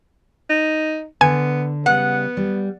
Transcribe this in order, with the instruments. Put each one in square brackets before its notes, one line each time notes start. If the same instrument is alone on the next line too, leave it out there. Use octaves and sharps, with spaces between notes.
[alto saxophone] D#4
[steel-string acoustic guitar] D3 [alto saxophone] B3 [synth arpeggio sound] G#5
[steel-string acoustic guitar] C#3 G3 [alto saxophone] B3 [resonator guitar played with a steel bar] F#5
[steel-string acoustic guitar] G3